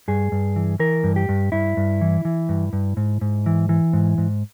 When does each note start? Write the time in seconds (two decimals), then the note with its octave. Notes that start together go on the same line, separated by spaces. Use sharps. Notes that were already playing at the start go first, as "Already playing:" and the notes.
0.08 G2 G#4
0.32 G2
0.56 E3
0.79 E3 A#4
1.04 G2
1.16 G4
1.29 G2
1.52 G2 E4
1.77 G2
2.01 E3
2.25 E3
2.49 G2
2.73 G2
2.97 G#2
3.21 G#2
3.46 E3
3.69 E3
3.93 G#2
4.18 G#2